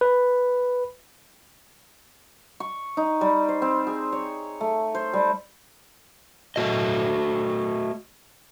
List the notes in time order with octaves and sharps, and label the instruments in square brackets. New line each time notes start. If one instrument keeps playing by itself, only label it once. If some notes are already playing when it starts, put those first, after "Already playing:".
[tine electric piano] B4
[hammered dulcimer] C#6
D#4
G3
C5
C4
G#4
C#5
A3
C5
G3
[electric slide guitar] A3 F#4 D#5